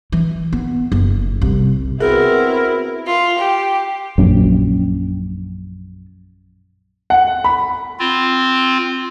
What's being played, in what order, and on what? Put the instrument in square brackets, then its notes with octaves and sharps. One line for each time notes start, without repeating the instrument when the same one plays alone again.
[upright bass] E3
B3
F#1
C2
[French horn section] B3 C4 F#4 [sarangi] E4 [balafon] G#4 [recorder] A#4
[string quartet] F4
G4
[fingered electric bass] A#1 F#2
[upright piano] F#5
B5
[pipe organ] C4 F4